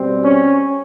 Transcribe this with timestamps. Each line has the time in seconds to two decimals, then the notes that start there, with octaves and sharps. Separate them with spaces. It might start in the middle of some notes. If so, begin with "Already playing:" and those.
Already playing: B2 G3 C4
0.25 C#4